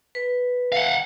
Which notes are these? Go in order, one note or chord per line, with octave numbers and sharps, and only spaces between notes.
B4
F5 F#5